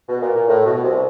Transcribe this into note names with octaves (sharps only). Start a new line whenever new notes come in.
B2
A#2
A#2
A2
B2
C2 C3